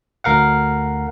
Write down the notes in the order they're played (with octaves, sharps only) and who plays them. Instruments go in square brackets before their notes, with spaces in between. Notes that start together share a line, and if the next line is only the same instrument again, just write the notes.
[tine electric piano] D2 A#4 F5 F#5